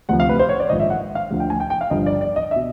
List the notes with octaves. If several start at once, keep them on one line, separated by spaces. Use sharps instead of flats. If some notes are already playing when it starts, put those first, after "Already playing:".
D2 C3 F3 F#5
F5
B4
C5
C#5
D5
A#1 G#2 D#3 D#5
E5
F#5
F5
D2 D3 F3
G5
G#5
G5
G5
F5
G1 G2 D3 F3 D#5
D5
D5
D#5
E5
B2